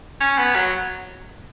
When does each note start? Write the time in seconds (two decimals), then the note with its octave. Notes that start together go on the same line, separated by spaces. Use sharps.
0.21 C#4
0.39 B3
0.55 F#3